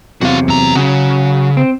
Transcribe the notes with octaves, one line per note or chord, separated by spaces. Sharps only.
E2 C3 F#3 F#4 F5
F#2 A#5
C#3 F#3 F#4
C4